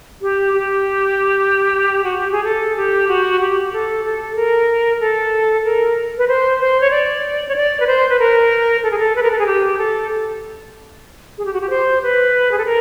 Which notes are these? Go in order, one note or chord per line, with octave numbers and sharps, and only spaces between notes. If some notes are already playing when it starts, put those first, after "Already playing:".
G4
G4
F#4
G4
G#4
A4
G4
F#4
G4
A4
A4
A#4
A4
A#4
B4
C5
C5
C#5
D5
C#5
D5
B4
C5
B4
A#4
A4
G#4
A4
B4
A#4
A4
G#4
G4
A4
G#4
G4
F#4
G4
C5
B4
G#4
A4
A#4